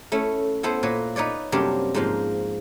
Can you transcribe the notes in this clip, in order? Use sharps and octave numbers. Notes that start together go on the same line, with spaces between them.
A3 C#4 E4
B3 E4 A4 C5
A#2 A#3 B4 C#5
D#4 B4 C#5 D5
F#2 C3 G3 A#3 D4 C#5
G#2 F3 A#3